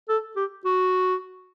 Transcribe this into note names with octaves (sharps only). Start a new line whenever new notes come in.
A4
G4
F#4